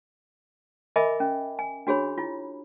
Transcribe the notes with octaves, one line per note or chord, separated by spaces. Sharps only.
A#4 D#5 E5 G#5 B5 D6
C#4
G#5
D4 F#4 G#4 C#5 B5
E4 F4